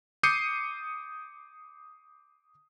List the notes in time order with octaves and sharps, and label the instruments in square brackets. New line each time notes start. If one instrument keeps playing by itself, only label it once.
[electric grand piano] D6 D#6 G6 C7 C#7 D#7